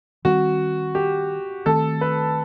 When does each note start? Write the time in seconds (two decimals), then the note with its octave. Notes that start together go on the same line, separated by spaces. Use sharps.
0.25 D#3 G3 C4 F#4
0.95 G4
1.66 D#3 A3 C4 A4
2.01 B4